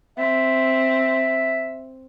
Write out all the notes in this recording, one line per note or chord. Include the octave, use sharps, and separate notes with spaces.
C4 E5